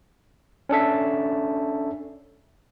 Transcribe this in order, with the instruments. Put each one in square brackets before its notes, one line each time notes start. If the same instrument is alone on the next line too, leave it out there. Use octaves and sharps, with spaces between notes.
[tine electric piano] C#4 D4 A4 E5